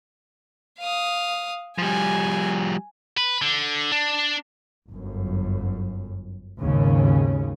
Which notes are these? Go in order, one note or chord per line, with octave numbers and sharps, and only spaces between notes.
F5 D#6
F3 G3 G#5
B4
D3
D4
G1 F#2
G#1 D#2 G#2 C#3 C#4